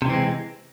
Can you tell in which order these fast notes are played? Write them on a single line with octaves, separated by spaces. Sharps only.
C3 E3 C4 G#3